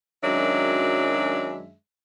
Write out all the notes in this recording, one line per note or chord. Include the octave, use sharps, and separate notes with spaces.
F#2 D#3 F#3 G#3 D4 E5